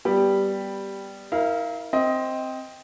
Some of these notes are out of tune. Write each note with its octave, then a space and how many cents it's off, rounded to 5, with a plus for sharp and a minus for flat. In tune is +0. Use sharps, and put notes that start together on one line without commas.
G3 +0 B3 -5 G4 +5
E4 -45 A#4 +0 F5 -20
C4 +0 D#5 +15